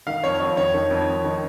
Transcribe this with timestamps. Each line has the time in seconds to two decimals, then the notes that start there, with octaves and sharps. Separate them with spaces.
0.07 D#3 F5
0.24 F2 C#5
0.40 F2 C#5
0.57 D#3 C#5
0.74 D#3
0.91 F2
1.07 F2
1.24 D#3